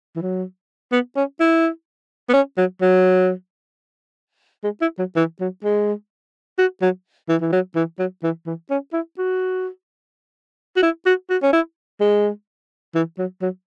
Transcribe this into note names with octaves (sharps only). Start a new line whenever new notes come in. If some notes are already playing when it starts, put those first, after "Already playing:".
E3
F#3
B3
C#4
E4
B3
C#4
F#3
F#3
G#3
E4
F#3
E3
F#3
G#3
F#4
F#3
E3
E3
F#3
E3
F#3
E3
E3
C#4
E4
F#4
F#4
E4
F#4
F#4
C#4
E4
G#3
E3
F#3
F#3